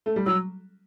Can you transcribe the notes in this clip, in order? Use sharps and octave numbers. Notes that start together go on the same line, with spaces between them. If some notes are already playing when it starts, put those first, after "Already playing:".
A3
G3
F#3 E6